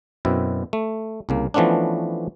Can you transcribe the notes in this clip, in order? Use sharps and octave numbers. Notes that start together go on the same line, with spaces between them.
F#2 B2 C4 E4
A3
C2 C#3 A#3
E3 F3 A3 B3 C#4 D4